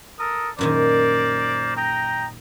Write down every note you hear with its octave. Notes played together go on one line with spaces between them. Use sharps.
A4 A#4 D#6
F#2 A#2 D#3 A#4 C5 D5
D#5 G5 A#5